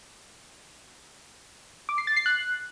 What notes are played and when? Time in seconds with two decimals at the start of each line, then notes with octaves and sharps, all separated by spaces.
1.89 D6
1.98 C7
2.07 A6
2.17 C7
2.26 F#6